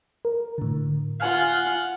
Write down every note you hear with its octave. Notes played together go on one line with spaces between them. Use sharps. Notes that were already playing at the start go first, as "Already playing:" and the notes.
A#4
A2 D3
F4 F#5 G#5 F6 F#6